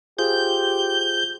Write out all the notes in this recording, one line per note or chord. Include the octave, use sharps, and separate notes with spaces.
F4 G4 G#4 C5 G6